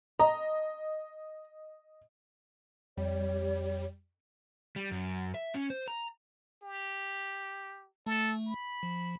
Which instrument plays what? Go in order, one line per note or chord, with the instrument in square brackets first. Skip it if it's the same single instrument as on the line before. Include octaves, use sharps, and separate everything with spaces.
[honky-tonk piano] D#5 [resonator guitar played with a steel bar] A#5
[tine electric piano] F2 [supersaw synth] G3 [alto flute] C#5
[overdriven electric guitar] G3
F#2
E5
C#4
C5
A#5
[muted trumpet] G4
[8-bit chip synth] A3 [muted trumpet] A4
[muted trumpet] B5
[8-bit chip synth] F3